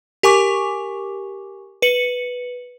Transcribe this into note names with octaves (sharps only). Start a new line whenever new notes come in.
G4 A#4 G#5 C#6 D6
B4 C#7 F#7